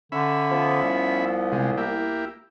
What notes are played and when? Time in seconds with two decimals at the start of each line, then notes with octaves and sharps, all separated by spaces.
0.12 D3 C#4 E5 B5
0.51 F3 B3
0.83 C2
1.52 C3 G#3
1.77 A#3 E4 G4